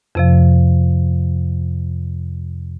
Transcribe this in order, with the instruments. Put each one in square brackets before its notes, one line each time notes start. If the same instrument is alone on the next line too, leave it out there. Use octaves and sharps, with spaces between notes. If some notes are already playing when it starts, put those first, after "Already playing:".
[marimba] F2 C3 F3